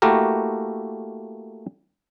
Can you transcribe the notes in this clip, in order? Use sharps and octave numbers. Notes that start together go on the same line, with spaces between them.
A3 A#3 E4 F#4 G4 A#4